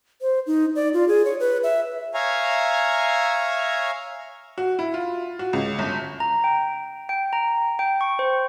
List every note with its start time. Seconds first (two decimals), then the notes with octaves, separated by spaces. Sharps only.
0.21 C5
0.47 D#4
0.75 D5
0.94 F4
1.08 G#4
1.25 C#5
1.40 B4
1.63 E5
2.14 C#5 E5 F5 G#5 A#5
4.58 F#4
4.79 E4
4.94 F4
5.39 F#4
5.53 C#2
5.79 G1
6.20 A#5
6.44 G5
7.09 G5
7.33 A#5
7.79 G5
8.01 C#6
8.19 C5